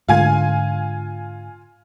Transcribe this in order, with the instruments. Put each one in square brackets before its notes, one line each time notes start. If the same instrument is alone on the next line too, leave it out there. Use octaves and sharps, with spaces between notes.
[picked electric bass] G#2 D3 [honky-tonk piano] F4 G#5 G#6